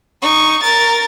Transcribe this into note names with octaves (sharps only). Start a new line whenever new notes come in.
D#4 C#6
A#4 A6